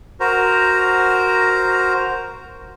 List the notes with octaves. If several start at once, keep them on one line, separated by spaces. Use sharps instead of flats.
F#4 A#4 C5 A#5